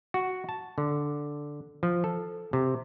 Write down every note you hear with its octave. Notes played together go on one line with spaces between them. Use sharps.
F#4
A5
D3
F3
A4
C3